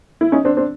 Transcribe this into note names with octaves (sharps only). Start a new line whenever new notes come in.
E4
C#4 D#4
C4 D4
C4 D4